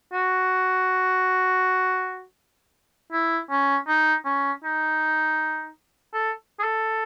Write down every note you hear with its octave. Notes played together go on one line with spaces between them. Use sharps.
F#4
E4
C#4
D#4
C#4
D#4
A4
G#4
A4